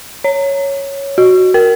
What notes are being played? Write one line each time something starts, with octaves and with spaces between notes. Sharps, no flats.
C#5
F#4
A#4